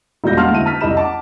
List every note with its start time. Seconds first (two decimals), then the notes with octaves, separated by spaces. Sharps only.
0.24 E1 A#2 G3 F4 G6 A#6
0.37 F5 F#5 A5 C6 F6
0.51 D2 E4 D#7
0.66 A5 F6 B6
0.81 C2 E4 G4 D#5 B5 E7
0.95 F#5 A5 D6